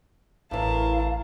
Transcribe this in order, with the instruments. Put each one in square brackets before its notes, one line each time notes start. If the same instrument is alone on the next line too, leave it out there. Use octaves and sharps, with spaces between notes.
[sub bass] A1 [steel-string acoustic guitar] A2 E3 [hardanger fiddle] A#4 A5 [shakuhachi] F5